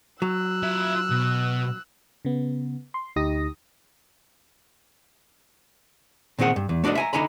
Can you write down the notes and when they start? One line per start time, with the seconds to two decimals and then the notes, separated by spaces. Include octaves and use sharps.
0.22 F#3 E6 F#6
0.63 F4 E5
1.11 B2
2.25 C#3 B3
2.94 C6
3.16 D2 D#4 G4 D#6 A#6
6.39 A#2 D#3 C4 G#4 F#5
6.56 G2
6.69 E2
6.84 A3 D4 F#4 D5 D#5
6.95 E5 G#5 A#5
7.13 D3 D#4 G#5 A#5 B5